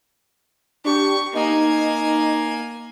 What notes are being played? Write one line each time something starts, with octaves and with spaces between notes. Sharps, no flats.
D4 G4 C#6
A#3 D#4 G#5